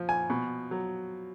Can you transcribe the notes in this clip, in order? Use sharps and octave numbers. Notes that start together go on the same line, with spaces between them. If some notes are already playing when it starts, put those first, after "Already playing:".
Already playing: F3
G#5
B2
F#3